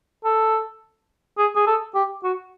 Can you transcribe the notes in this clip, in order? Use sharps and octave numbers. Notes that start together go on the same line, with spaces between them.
A4
G#4
G#4
A4
G4
F#4